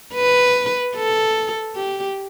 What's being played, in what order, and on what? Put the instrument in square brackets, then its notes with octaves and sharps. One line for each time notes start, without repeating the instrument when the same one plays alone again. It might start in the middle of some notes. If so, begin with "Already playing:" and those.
[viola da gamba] B4
A4
G4